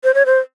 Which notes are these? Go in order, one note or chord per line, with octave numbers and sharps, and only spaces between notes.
C5
C#5
C5